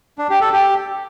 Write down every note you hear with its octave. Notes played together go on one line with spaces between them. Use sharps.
D4
G4
A4
G4